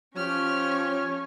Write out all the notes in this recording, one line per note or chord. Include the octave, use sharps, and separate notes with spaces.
F3 C#4 G4 C#5 F6